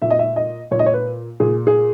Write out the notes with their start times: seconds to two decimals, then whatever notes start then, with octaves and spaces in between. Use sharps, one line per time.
0.02 A#2 E5
0.10 D#5
0.19 E5
0.36 D#5
0.71 A#2 C#5
0.79 D#5
0.86 C#5
0.94 B4
1.40 A#2 G#4
1.67 G#4